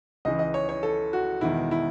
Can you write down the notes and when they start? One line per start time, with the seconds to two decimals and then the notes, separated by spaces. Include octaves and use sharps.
0.25 C#2 C#3 E3 D#5
0.39 D#5
0.54 C#5
0.69 C#5
0.83 A4
1.13 F#4
1.41 E1 E2 D#3 E4
1.71 E4